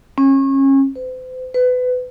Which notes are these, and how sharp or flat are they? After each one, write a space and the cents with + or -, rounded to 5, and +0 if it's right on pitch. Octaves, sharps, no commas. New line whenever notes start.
C#4 -30
C5 -40
B4 +25